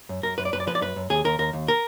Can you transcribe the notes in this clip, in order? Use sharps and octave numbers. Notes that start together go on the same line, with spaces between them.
F#2
F#2 A#4
F#2 B4
D5
F#2 B4
D5
F3 B4
D5
F#2 B4
F#2
D#2 G#4
D#2 A#4
D#2 A#4
D#2
A#4